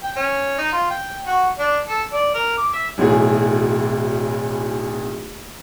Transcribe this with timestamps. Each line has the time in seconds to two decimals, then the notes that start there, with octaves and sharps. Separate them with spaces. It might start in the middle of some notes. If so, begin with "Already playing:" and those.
0.03 G5
0.16 C#4
0.58 D#4
0.72 F4
0.90 G5
1.27 F#4
1.59 D4
1.87 A4
2.13 D5
2.34 A#4
2.58 D6
2.73 E5
2.98 D1 B1 E3 A3 G#4